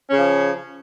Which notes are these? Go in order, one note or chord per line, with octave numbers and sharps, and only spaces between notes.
C#3 F3 C#4